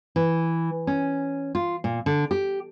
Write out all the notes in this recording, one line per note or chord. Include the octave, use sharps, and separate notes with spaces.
E3
C#4
F4
A#2
D3
G4